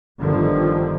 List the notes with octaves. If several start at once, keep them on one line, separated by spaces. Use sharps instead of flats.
G1 D3 D#3 F3